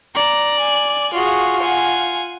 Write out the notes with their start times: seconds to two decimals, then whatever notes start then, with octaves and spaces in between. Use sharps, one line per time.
0.15 D5 A#5
0.59 G#5
1.13 F4 F#4 G#4
1.62 F#5 G#5